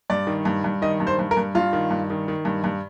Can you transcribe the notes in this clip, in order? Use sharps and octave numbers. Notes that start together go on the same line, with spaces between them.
G2 D5
D#3
G2
G2
D#3 D#5
G2
C5
G2
A#4
G2
G2 F4
D#3
G2
D#3
D#3
G2
G2